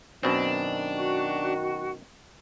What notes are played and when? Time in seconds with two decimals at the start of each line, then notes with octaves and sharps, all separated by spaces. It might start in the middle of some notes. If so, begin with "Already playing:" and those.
0.23 F#2 B2 D#3 C4 D4
0.93 F#4